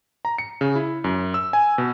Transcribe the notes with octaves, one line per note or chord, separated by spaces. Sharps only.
A#5
C#7
C#3
E4
F#2
E6
G#5
B2